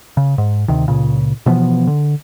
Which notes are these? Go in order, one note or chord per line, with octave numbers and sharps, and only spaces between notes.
C#3
G#2
D2 C3 D#3
C#2 A#2 C#3
B2 E3 F3 B3
D3